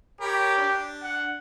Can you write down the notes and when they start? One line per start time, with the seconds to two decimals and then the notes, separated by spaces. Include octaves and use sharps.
0.21 G4 A#4 C#5 B5
0.57 D4
1.03 F#5